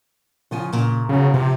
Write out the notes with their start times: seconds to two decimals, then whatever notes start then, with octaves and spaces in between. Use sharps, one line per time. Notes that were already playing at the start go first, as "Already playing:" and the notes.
0.51 C#3 F3 G#5
0.72 A#2 C#3
1.09 E2 C#3 F#3
1.34 C3 F3